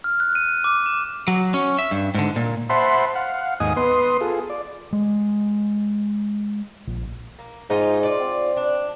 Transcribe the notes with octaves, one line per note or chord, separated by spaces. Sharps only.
F6
F#6
D#7
D6
E7
F#3
C#4
E5
G2
G#2 D3
A#2
C5 E5 F#5 A5 B5 C6
F5 F#5
D#2 G#2 D#5 G#5 D#6
B3 B4 C6 D#6
F4 G#4 A4
D5
G#3
A#1
A#3
G#2 F3 D#4 F4
F4 D5
C4
D4